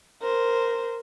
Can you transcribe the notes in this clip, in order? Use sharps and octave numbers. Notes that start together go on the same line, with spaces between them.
A#4 C5